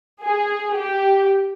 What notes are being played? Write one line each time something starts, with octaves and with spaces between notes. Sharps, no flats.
G#4
G4